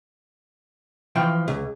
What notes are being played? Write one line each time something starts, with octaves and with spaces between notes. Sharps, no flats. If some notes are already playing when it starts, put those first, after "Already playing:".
E3 F3 G5
C#2